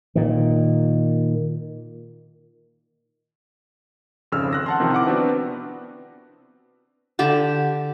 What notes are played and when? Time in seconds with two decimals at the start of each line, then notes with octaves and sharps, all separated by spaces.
0.15 A#2 D#3
4.32 G#1 F2 C#3 E6 F6
4.53 C6 F#6 A#6
4.66 F#5 A5 C6
4.80 C3 D#3 F3 C4
4.93 E4 F#5 D6
5.07 B3 C4 D4 F#4 B4
7.19 D3 G4 A5